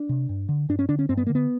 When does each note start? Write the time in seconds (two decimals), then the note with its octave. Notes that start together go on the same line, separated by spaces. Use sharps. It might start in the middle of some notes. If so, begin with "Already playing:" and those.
Already playing: D4
0.09 C3
0.29 G2
0.49 D3
0.69 G2 D4
0.79 C#4
0.89 D3 D4
0.99 C#4
1.09 G2 C4
1.17 B3
1.27 D3 A#3
1.35 B3